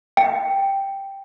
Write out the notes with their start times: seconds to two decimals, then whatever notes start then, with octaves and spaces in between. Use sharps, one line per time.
0.17 G5